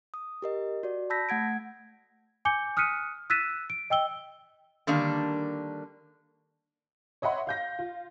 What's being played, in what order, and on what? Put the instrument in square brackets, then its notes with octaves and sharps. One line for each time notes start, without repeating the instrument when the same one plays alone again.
[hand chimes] D#6
G4 A#4 D#5
F#4 D5
A5 B5 E6 G6 A#6 B6
A3 F#5 G#6 D7
[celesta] G#5 D6 G6 C#7 G7
D#6 F6 F#6 B6 C#7 D#7
E6 F#6 A6 B6 D#7 E7
D7
D#5 G5 E6 G7
[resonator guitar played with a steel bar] D3 D#3 G3 A#3 D4
[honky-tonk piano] C#5 D#5 E5 F#5 B5 C6
F5 G6 A#6
F4